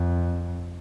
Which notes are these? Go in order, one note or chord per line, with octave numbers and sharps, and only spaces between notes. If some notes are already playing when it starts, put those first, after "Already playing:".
Already playing: F2